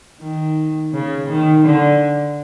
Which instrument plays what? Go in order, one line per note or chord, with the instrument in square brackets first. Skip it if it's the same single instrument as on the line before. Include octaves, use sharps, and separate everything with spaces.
[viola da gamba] D#3
C#3
D#3
D3